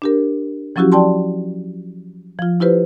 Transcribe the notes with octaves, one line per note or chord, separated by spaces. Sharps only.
D4 G4 A#4
F3 F#3 C#4 E4 F#4 G4
D5 G5 A5 C6
F3 F4
E4 F4 G4 B4 C5